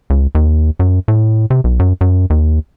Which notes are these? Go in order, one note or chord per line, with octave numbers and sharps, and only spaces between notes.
C#2
D#2
F#2
A2
C3
B1
F#2
F#2
D#2